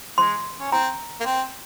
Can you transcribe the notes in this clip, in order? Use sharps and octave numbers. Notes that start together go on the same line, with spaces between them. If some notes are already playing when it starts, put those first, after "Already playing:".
G#3 C6
C#4
C4 A#5
A#3
C4